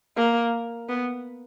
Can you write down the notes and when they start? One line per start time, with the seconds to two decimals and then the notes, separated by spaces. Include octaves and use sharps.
0.17 A#3
0.89 B3